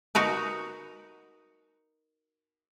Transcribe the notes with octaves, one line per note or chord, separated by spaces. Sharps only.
D#4 F#4 A#4 B4